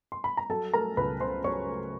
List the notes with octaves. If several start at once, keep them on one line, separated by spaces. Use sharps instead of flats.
C6
B5
A#5
F#3 A4 A5
A3 A#4 A#5
C#2 B4 B5
C#3 C5 C6
F#3 C#5 C#6
A3